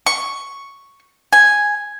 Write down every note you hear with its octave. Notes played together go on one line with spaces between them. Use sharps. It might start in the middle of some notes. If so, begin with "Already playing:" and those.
C#6
G#5